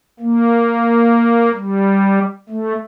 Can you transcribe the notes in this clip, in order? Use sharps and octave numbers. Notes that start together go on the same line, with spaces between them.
A#3
G3
A3